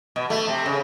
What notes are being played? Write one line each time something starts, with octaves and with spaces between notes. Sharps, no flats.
B2
A3
C3
C#3